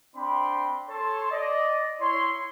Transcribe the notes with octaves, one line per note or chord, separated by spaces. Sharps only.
C4 D4 G5 B5 C6
A4 C#5 A5 C6
D5 D#5
E4 C#5 C6